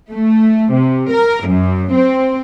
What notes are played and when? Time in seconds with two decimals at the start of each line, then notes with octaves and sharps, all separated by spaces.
0.11 A3
0.72 C3
1.12 A#4
1.47 F#2
1.93 C4